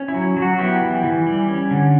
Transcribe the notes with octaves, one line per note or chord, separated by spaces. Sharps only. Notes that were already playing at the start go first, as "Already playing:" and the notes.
Already playing: C#4
E4
F#3
F#3
F#4
B3 E4 G4
E3
E3
G3
C#4
D3